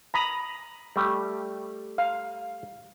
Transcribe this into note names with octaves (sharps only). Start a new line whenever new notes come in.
A#5 B5 D#6
G3 A3 G4
F5